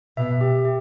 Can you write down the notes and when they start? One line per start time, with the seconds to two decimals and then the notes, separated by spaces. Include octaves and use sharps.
0.17 B2 E5
0.41 G4
0.65 G4